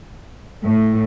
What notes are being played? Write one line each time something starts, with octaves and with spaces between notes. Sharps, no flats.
A2